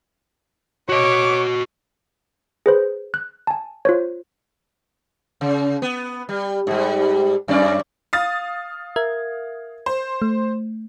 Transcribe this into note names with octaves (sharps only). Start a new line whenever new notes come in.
F#4 C#5 D#5 D6
G#4 B4 C5
F#6
G#5 A5
F4 C5 C#5
C#3
B3
G3
G#2 G3
F#2 C#4 D5
F5 D#6 A6
A#4 E5 G#6
C5
A3